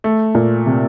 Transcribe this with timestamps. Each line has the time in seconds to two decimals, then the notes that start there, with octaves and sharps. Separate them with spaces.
0.04 A3
0.35 A#2
0.66 C3